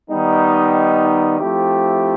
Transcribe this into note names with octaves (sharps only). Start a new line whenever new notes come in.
D#3 G3 B3 D#4
F3 A3 C4 E4 G4